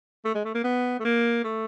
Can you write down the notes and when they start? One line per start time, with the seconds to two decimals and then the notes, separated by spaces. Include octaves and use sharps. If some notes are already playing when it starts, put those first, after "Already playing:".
0.25 A3
0.35 G#3
0.45 A3
0.55 A#3
0.64 B3
1.00 A3
1.05 A#3
1.44 A3